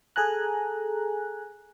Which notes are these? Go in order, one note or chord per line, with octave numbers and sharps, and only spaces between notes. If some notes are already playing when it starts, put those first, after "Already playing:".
G#4 A4 G#5 A#5 F#6